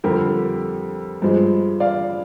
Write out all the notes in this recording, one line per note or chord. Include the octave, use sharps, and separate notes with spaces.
F2 D3 G3 G4 A#4
G2 F3 G#3
D5 F5